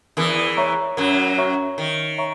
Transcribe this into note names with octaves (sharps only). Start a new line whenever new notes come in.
E2 E3 A#4
C#5 E5 A#5 C#6
F#2 F#3 A#4
C#5 E5 A#5 C#6
D#3 A#4
C#5 E5 A#5 C#6